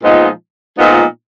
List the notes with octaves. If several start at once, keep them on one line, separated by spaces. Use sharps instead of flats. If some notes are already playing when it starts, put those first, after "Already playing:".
A#2 F3 G#3 B3 D#4
A#2 F3 G#3 B3 D#4